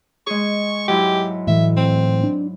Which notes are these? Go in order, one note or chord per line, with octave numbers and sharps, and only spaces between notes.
G#3 G#4 C#6
G#2 F#3 E4 G4
A2 E3 A3 E5
C4
D4